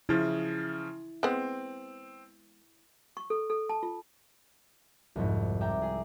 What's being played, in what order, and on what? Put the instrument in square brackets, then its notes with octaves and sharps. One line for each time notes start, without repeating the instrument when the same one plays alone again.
[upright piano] C#3 F3 [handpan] E4
[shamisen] G#3 B3 [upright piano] C4
[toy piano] C#6
A4
A4
A5
F4
[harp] C2 F2 G#2
D5 E5 G5 A#5
G#4